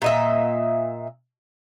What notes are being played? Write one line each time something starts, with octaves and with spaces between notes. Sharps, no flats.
A#2 D#5 E5